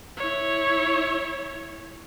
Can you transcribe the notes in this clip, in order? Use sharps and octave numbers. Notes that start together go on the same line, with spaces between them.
E4 C#5